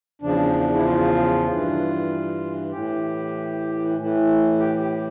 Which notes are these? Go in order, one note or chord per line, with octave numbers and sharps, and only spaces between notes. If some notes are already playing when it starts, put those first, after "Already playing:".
E2 C#3 F3 D4
E4
F4
G2 E3
A2 E3 G4
A2 E3
G4
G4